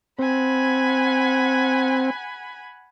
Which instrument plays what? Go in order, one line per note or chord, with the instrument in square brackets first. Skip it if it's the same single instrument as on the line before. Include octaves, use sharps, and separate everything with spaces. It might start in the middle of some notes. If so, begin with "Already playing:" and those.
[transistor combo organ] C4 [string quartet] F#5 G#5 B5